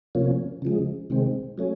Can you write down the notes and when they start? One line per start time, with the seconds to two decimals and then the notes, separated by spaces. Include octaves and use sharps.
0.15 C3 F3 A#3 C#4
0.62 C#3 F3 G#3
1.10 C3 D#3 G#3 C4
1.58 F#3 A3 C#4